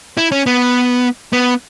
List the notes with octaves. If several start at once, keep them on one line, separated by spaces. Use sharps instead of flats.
E4
C#4
B3
B3